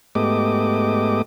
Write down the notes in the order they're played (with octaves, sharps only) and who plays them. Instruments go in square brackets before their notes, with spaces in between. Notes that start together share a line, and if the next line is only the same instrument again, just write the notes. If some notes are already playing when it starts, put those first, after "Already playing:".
[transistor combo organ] G#2 A3 B3 G4 D#5 D6